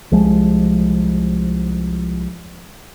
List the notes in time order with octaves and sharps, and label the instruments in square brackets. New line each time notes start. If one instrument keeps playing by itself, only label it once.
[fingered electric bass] C2 F3 G#3